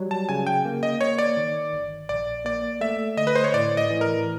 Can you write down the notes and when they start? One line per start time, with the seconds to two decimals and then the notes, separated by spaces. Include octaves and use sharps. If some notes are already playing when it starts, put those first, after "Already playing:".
Already playing: F#3 G3
0.11 A5
0.29 C#3 G#5
0.47 G5
0.65 A#3
0.83 D#5
1.01 A#3 C#5
1.18 D5
1.37 D#3
1.73 G1
2.09 A#1 D5
2.45 A#3 D5
2.81 A3 E5
3.17 D3 D#5
3.27 B4
3.35 C5
3.44 C#5
3.54 A2 D5
3.77 D#5
3.90 E3
4.01 A#4